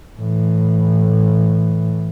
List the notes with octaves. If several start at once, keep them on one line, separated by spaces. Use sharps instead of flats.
A2 E3